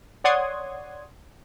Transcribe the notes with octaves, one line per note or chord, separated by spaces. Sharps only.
C#5 D5 F#5 C6 D#6 G#6